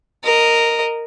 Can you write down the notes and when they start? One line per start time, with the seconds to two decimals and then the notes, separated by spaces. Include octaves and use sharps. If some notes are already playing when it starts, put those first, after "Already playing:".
0.24 A#4 D#5